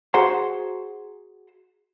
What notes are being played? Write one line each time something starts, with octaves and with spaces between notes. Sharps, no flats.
F#4 G#4 C5 F#5 A#5 C6